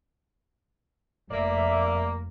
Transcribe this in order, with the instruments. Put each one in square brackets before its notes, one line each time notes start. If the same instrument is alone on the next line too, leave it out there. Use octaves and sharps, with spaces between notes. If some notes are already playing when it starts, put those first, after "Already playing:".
[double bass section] F1 [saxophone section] A#3 [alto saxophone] D5 [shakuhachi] E5